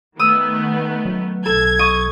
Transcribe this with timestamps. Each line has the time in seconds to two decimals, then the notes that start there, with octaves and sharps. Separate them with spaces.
0.19 D#3 A3 B3 D#6 E6
1.05 F#3
1.46 B1 A4 G#6
1.79 D#5 C#6 D#6